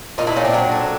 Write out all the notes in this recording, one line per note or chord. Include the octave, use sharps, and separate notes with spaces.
A#2 D#4 F4
D4 E4
A#2 C#4 D#4
C4 D4
F#3
A3